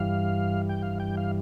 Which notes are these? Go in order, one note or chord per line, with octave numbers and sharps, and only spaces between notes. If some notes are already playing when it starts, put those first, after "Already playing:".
Already playing: G2 E3 G3 F5
G5
F5
G5
F5